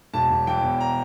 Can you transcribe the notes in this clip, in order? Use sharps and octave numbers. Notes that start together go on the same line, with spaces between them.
E1 A5
E1
E3 G5
E2
A#5